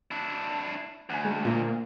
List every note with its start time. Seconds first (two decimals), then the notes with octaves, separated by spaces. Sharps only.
0.11 D4 E4
1.10 D2 F#5 G#5
1.25 G#3
1.45 A#2